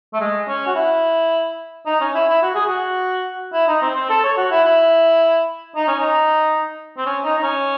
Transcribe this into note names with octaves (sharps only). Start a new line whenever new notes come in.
A3
G#3
C#4
F#4
E4
D#4
C#4
E4
E4
F#4
G#4
F#4
E4
D#4
C4
C4
A4
C#5
F#4
E4
E4
D#4
C#4
D#4
C4
C#4
D#4
D#4
C#4